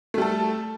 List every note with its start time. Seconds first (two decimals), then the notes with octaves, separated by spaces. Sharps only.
0.14 A3
0.18 G3
0.22 A4